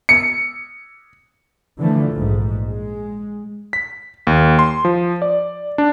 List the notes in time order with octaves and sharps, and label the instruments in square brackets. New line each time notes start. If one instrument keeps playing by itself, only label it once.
[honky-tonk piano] C#7
[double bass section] D3 E3 F3 A3
A#1 G#2
G#3
[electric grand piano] B6
D#2
C6
F3
D5
D4